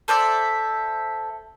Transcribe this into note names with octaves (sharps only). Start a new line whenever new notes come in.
A4 C5 D5 E5